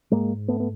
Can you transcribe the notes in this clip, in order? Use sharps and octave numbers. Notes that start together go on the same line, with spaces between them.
G#2 G#3 A#3
A3 B3
B3